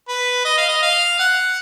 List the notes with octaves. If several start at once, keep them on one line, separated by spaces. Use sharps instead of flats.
B4
D#5
F5
D#5
F5
F#5